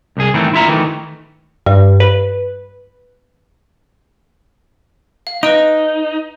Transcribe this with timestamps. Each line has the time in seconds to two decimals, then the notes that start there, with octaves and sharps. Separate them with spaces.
0.17 C2 G#4
0.34 A2 D#3 E3 A3 C4
0.53 E4 F4 E5 A#5
0.68 D#3 E3 A3
1.66 G2
2.00 B4
5.27 F5
5.43 D#4 B4 D#5 D7